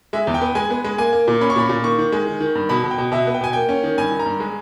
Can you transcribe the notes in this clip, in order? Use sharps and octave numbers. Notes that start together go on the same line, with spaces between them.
G#3 E5
E2
G5
B3
G#3 G#5
B3
G#3
A#3 G#5
A#3
A#2
C#4 B5
C#6
A#2 B5
A#2
D#3 C#6
D#3
G#3
D#3
D#3
G2
B2 B5
B2
G5
B2
B2 E5
B3
G5
B2 G#5
A#3 G5
C#4
D#3
G2 G#5
D#3
A#5
G2
G#3